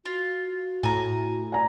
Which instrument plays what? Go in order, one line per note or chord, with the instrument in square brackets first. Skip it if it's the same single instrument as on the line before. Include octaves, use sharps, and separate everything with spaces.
[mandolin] F4 [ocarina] F#4
[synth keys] A2 [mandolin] G#5 A#5
[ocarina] D5 [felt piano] G#5 A#5